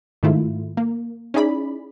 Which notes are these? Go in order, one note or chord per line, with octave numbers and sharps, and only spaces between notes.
G#2 D#3 A3 E4 F4
A#3
C#4 D#4 E4 G#4 D5 B5